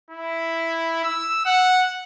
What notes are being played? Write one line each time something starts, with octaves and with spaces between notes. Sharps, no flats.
E4
E6
F#5